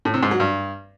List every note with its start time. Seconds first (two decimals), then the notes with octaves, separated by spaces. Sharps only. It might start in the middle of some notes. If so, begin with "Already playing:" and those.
0.05 A2
0.14 C3
0.23 G#2
0.31 F#3
0.40 G2